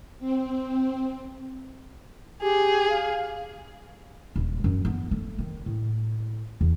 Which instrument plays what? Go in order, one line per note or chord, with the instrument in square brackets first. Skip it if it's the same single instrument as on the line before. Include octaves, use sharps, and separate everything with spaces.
[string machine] C4
[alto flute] G4 [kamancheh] G#4
[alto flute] F5
[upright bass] D#1
F#2
B3
A3
D#3
A2
E2